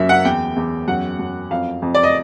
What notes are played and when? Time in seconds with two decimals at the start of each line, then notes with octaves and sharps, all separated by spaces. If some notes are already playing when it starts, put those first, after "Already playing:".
Already playing: F#2 A#3 E5
0.09 F#5
0.25 E2 G5
0.56 E2
0.88 F#2 F#5
1.19 F#2
1.50 F2 F5
1.82 F2
1.94 D5
2.03 D#5